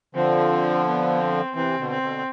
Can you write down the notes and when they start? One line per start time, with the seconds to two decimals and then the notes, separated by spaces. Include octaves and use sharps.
0.15 D3 F3 C4
0.86 B3
1.20 C4
1.55 C3 E3 C4
1.79 B2 D3
1.91 C4
2.02 B2 D3